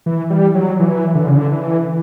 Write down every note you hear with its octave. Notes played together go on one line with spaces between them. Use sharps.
E3
G3
F#3
E3
D3
C#3
D3
E3